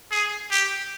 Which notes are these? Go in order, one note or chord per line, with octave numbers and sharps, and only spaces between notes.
G#4
G4